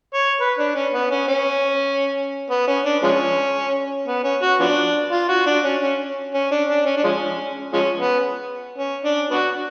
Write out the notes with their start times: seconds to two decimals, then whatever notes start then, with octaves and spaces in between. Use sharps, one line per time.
0.14 C#5
0.40 B4
0.58 D4
0.75 C#4
0.94 B3
1.11 C#4
1.28 C#4
2.50 B3
2.67 C#4
2.85 D4
3.03 F3 G#3 C#4
4.07 B3
4.24 C#4
4.42 F#4
4.60 F3 B3 D4
5.12 F4
5.29 F#4
5.46 D4
5.64 C#4
5.82 C#4
6.34 C#4
6.51 D4
6.69 D4
6.85 C#4
6.97 D4
7.04 F3 G#3 C#4
7.73 F3 G#3 C#4
7.99 B3
8.78 C#4
9.04 D4
9.30 B3 D4 F#4